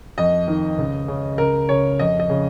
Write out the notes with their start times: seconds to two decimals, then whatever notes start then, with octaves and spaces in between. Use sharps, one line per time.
0.18 F2 D#5
0.48 D#3
0.78 C#2
1.08 C#3
1.38 C#2 A#4
1.69 C#3 C#5
1.99 F2 D#5
2.20 D#5
2.29 C#3